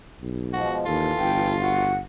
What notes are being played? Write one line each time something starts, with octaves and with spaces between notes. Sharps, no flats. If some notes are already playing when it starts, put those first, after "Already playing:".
B1
B2 F3 G#3 F#4
D#2 E3 F4 A4
G1 G5
F#4 F#5